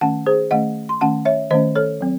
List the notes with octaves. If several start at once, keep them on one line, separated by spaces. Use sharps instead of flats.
D#3 A3 C#4 F#5 A5
G#4 C5
D#3 A3 C#4 D#5 F#5
C6
D#3 A3 C#4 F#5 A5
C#5 E5
D#3 A3 C#4 C5 D#5
A4 C#5
F#3 C4